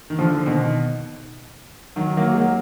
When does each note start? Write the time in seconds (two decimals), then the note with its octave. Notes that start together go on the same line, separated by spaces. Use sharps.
0.10 D#3
0.19 D3 F3
0.46 B2 D#3
1.96 D#3 F#3
2.17 F#3 A#3
2.33 G#3
2.37 F#3 A#3